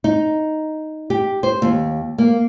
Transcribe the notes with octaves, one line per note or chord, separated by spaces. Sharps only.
D#4
G4
C5
D#2
A#3